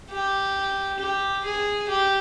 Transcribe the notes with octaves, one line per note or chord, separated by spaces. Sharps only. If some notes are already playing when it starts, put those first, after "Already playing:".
G4
G4
G#4
G4